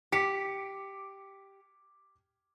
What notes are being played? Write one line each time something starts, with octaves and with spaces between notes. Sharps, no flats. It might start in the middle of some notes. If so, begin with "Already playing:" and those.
G4 D6 B6 C#7